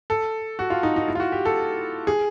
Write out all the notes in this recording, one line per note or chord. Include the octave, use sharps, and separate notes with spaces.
A4
F#4
F4
D#4
D#4
E4
F4
F#4
G4
A4
G#4